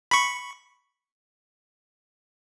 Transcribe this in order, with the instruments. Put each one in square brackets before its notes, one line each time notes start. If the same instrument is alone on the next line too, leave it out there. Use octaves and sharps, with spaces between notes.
[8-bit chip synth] B5 C#6